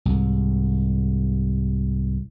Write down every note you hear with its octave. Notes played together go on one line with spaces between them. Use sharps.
C2 G#2